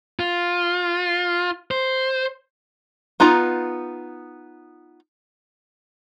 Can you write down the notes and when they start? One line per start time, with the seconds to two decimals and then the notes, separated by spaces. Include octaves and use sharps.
0.19 F4
1.71 C5
3.20 B3 D#4 F4 A#5